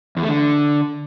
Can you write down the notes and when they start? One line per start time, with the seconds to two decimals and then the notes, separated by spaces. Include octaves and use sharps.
0.17 E2
0.23 A3
0.29 D3